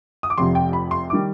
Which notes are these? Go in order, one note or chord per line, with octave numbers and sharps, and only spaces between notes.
D#6
D6
F1 F2 C3 C6
G5
B5
C6
D#3 G3 D6